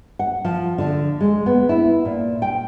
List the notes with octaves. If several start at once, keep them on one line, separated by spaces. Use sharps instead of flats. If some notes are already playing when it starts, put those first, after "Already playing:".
F#5
F3
D3
G#3
B3
E4
A#2
G5